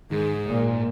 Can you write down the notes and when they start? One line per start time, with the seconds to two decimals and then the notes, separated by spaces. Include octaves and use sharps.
0.11 G#2 D#3 G#4
0.46 G#1 A#2